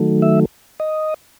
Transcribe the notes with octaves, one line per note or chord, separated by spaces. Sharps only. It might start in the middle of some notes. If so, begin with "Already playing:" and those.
Already playing: D#3 F#3 A3
E5
D#5